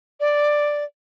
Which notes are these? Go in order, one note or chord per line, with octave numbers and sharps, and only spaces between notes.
D5